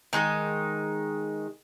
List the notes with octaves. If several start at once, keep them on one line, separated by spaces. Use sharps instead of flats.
D#3 G#3 D#4